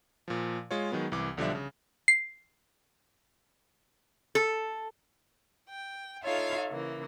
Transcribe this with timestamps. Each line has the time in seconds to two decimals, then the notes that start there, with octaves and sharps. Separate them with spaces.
0.28 A#2 F3
0.71 G#3 F4 C#5
0.92 D#3 F#3 G#3 B3
1.12 C2 E3 D6
1.37 B1 D3 F3 G3 D4 E5
1.55 C#3
2.08 C7
4.35 A4
5.68 G5
6.23 D#4 F4 A4 C#5 E5 F5
6.69 C#3 E3 A#3